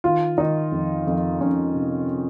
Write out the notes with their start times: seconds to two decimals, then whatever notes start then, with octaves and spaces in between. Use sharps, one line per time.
0.04 D#3 F4
0.38 D#3 D#4
0.72 F2
1.07 F2
1.41 F2 C#4
1.74 C3